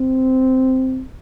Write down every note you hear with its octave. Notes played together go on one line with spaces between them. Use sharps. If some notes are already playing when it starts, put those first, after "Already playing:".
Already playing: C4